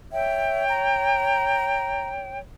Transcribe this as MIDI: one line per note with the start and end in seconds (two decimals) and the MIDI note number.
0.12 2.39 73
0.12 0.65 76
0.12 2.39 79
0.69 2.09 82